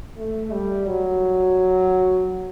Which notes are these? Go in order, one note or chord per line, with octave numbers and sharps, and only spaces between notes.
A3
G3
F#3